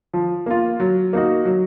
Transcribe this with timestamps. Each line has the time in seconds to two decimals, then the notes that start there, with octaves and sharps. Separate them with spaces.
0.14 F3
0.46 A#3 F4
0.80 F#3
1.13 A#3 D#4 F#4
1.45 F#3